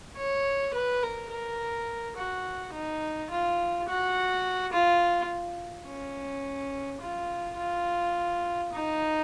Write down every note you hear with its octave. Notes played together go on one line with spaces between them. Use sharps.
C#5
B4
A#4
A#4
F#4
D#4
F4
F#4
F4
C#4
F4
F4
D#4